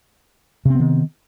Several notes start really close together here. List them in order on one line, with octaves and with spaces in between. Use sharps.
C3 C4 B3 D#3